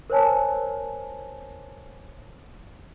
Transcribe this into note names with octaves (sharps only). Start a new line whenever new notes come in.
A#4 C5 C#5 G#5 A5